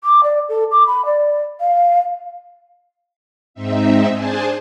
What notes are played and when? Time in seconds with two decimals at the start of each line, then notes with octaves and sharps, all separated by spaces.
0.04 D6
0.23 D5
0.49 A4
0.71 D6
0.87 B5
1.05 D5
1.60 F5
3.54 G#2 C4 D#4 E5
4.13 D4 G#4 C5 G#5 A5